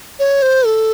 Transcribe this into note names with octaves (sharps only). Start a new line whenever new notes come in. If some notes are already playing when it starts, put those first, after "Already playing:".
C#5
C5
A4